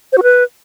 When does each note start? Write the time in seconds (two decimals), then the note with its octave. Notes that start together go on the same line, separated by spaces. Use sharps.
0.12 C5
0.18 F#4
0.23 B4